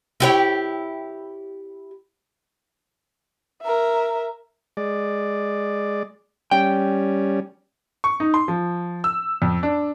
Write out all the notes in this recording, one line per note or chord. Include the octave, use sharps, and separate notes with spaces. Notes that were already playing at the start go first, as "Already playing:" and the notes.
E4 G4 C#5
A#4 E5
G#3 D5
G3 C#4 G5
C#6
D#4
C6
F3
E6
F2
D4